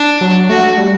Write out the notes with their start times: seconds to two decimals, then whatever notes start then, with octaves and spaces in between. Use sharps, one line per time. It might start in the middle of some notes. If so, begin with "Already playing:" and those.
Already playing: D4
0.21 F#3
0.49 A3 F#4
0.78 G3